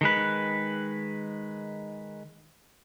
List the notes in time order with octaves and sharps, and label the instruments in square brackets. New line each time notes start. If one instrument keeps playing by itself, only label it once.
[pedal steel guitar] D#3 G#3 B4